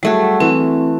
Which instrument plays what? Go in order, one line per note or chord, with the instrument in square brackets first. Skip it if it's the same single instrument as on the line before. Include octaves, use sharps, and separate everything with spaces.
[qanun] F#3 A3 F#4 [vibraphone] G3 G#4
[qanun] E3 [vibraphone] C4